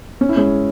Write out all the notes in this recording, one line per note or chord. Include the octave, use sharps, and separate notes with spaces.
C#4
E4
G#3 C#4